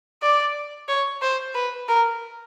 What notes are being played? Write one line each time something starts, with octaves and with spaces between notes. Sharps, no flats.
D5
C#5
C5
B4
A#4